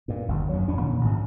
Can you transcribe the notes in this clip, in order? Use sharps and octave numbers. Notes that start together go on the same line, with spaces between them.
G2 A#2
G1 D#2
F#2 F#3
F2 C#4 D4
A#2 D#3 C#4
A1 G#2